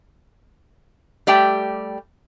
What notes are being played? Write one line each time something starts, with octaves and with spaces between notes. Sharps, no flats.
G3 A3 G4 G5